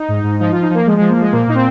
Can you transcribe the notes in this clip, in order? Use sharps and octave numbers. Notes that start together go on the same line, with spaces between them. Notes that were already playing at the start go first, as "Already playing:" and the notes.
Already playing: D#4
G#2
G#2
F3 D#4
F3 F4
D#4
F3 A#3
F3 G#3
F3 G#3
A#3
F3 G#3
A#2 A#3
A#2 D#4
C4